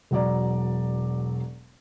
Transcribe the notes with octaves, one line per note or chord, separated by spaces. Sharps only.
E1 F#3 D5 A#5